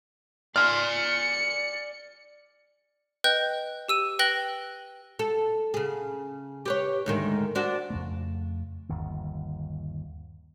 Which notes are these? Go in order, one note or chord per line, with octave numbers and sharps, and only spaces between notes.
D5 G#5 C6 F6
C#7
B4 D#5 G5 F#6 G6
G4 E6 D#7
B4 G5 F#6 A#6 F#7 G7
A4
C#3 G#4
G4 B4 C#5
D2 G#2 D#3
C4 D4 F#4
F2 C#3 A3
G1 D#2